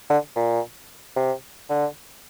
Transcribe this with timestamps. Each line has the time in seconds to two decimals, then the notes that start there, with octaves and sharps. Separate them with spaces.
0.10 D3
0.36 A#2
1.16 C3
1.70 D3